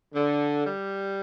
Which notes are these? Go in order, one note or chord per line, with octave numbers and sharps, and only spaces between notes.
D3
G3